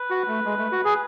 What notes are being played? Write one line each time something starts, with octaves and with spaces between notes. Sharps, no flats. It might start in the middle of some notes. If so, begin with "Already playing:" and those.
Already playing: B4
F#4
A3
G#3
A3
F#4
G#4